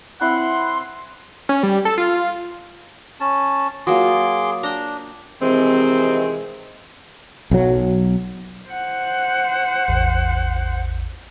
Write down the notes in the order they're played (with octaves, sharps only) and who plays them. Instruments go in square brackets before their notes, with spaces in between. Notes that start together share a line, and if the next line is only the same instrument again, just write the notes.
[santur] C4 E4 B5 [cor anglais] F#5 [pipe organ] C6
[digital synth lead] C#4
G3
A4
F4
[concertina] C#4 A5
[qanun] F#3 A#3 F4 [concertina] G#4 C6 D6
[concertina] D4 [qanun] G5 A#5
[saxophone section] C3 D#3 E3 G#3 C4
[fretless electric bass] B1 F#3
[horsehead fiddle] C5 F#5
[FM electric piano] A1 E2